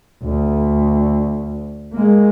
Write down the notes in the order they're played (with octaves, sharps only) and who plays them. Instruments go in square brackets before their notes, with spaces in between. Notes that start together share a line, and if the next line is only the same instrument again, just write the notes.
[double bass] D2
G#3 A#3